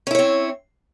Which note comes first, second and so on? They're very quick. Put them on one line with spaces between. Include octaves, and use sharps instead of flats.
C#4 E4 C#5 C4